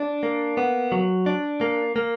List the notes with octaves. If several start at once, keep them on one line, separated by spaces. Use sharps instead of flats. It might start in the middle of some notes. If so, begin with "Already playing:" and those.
Already playing: D4
A#3
B3
F#3
D4
A#3
A#3